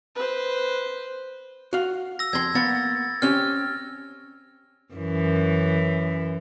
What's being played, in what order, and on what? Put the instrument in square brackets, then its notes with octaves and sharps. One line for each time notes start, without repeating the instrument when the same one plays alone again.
[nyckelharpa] B4 C5
[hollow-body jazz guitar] F#4 F5
[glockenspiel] E6 A#6
[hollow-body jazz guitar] F2 C6 [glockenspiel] G#6 A#6
[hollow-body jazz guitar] A#3 B3 F#5 [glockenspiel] A6
[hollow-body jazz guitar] C4 C#4 G4 [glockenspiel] F6
[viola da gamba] F#2 E3